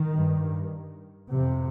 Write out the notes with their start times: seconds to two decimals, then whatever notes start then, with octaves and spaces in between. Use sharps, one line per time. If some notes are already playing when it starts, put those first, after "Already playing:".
Already playing: D#3
0.14 G2
1.31 F2 C3